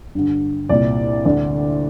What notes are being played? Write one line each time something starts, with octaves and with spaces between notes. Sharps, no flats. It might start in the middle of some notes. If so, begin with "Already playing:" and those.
G2 D3
C2 A#2 D5
D2 D3 D5